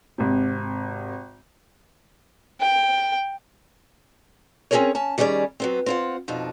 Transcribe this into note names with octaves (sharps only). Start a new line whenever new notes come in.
G#1 C3
G5
C4 C#4 F4 G#4 A#4 C#5
C#4 A5
D#3 G3 C#4 G#4 D5
F#3 B3 C4
C4 F4 F#5
F2 B2 D4 D#4